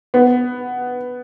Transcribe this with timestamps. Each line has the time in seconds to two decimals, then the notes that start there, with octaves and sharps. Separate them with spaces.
0.14 B3